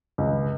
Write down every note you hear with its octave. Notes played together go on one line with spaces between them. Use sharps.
C#2